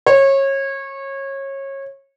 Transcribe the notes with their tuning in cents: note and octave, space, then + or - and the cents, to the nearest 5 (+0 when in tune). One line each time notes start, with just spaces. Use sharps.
C#5 -25